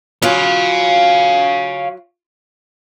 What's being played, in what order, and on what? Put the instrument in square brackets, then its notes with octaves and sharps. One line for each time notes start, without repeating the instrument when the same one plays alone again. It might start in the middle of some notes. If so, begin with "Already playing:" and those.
[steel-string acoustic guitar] F#3 F4 [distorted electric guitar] C#5 F5